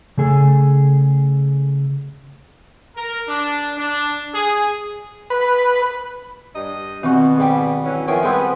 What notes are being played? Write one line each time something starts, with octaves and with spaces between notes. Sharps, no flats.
C#3 A3 G#4 A4
A#4
D4
D4
G#4
B4
G2 G3 D#5
B2 D#3 E3 C4 F#4
G#2 G3 G4
E3 F#3 C#4
F3 B3 C#4 A#4 E5 G5 G#5
G3 G#3 B3 C4 B4 G#5 B5 E6